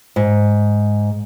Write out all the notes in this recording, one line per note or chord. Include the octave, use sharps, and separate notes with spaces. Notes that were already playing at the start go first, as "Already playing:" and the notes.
G#2